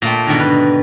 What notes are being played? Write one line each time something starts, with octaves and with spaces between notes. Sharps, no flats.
A#2 A3 G5
G#2 B2 D3 D#3
B4